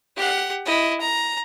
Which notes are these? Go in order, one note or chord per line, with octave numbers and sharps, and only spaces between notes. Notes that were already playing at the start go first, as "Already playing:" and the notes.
G4 F#5
E4 D#5
A#5